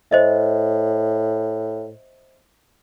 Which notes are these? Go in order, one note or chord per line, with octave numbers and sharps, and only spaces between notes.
A2 C5 D#5 E5